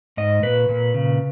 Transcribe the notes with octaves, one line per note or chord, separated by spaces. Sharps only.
G#2 D#5
A#2 B4
A#2
C#3